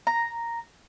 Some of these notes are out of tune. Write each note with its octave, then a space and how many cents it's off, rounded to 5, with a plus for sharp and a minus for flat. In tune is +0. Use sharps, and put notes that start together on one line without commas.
A#5 +0